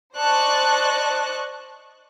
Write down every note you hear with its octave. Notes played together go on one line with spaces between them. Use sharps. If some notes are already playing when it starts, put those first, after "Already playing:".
C5 D5 D#5 A5 C#6 F#6